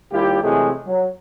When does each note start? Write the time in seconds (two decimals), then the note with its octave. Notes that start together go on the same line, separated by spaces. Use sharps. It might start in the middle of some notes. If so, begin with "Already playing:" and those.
0.12 D#2 G3 E4 F4 G4
0.42 C3 E3 F#3 G#3 A3 G#4
0.87 F#3